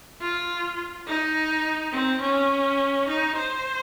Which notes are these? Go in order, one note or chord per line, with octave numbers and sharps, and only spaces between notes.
F4
D#4
C4
C#4
D#4
C5